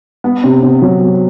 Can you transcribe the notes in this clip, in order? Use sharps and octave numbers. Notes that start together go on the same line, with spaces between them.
B3
C3
C3
F#3
B3